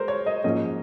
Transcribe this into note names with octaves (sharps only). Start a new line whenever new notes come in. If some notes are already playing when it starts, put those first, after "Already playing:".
Already playing: G#3 A#4 C5
C#5
D#5
G#2 F3 A#3 C#4 D#5